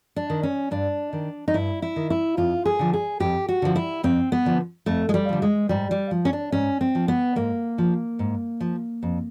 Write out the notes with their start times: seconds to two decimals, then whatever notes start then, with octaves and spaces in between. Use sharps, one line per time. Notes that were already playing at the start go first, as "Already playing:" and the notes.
0.16 D4
0.30 D#3
0.43 C#4
0.71 G2 D4
1.13 D#3
1.48 D#4
1.54 G2 E4
1.82 E4
1.96 D#3
2.10 E4
2.37 F2 F4
2.65 G#4
2.79 D3 F3
2.93 G#4
3.20 F2 G4
3.49 F#4
3.62 D3 F3
3.76 E4
4.04 F2 C4
4.32 B3
4.45 D3 F3
4.86 F2 A3
5.09 G#3
5.14 G3
5.29 D3 F3
5.42 G#3
5.69 G#2 G3
5.91 G3
6.11 F3
6.25 C#4
6.33 D4
6.52 G#2 C#4
6.81 C4
6.95 F3
7.08 B3
7.36 G#2 A#3
7.78 F3
8.19 G#2
8.60 F3
9.03 F2